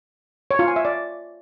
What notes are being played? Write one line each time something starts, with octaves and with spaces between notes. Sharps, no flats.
C#5
F4
G#5
E5
D5